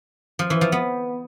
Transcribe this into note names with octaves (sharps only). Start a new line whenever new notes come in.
F3
E3
F3
B3